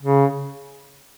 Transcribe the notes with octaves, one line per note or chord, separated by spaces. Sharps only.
C#3